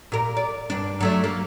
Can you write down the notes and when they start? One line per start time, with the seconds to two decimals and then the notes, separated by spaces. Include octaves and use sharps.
0.12 A#2 A#4
0.37 D5
0.70 G2 D4
1.01 F#3 A3 D4
1.24 A#3